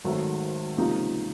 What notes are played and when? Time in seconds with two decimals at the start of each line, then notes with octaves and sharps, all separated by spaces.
0.04 G#1 G#2 D#3 F#3 A3
0.77 C#2 C3 F3 A#3 D#4